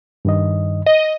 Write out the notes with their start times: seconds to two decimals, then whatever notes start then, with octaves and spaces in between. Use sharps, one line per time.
0.25 G2 D#3 D#5
0.86 D#5